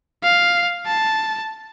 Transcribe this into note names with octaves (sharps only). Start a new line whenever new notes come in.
F5
A5